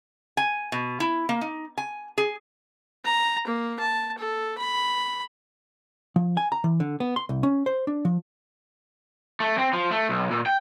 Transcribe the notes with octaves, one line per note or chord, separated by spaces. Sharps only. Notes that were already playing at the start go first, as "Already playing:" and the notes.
G#5
B2
E4
A#3
D#4
G#5
G#4
A#5
A#3
A5
A4
B5
F3
G#5
A#5
E3
D3
B3
C6
C2
C#4
C5
D4
F3
A3
C4
F3
A3
B1
A#2
G5